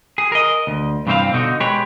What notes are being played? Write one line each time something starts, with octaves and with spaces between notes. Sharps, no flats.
G#4
A#4 D#5
D2
G2 C3 E3 C4 C5 F5
B2 D3 D#4 F#4
G#3 G4 B4 C#5